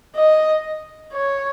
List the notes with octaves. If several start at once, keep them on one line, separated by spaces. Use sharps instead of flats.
D#5
C#5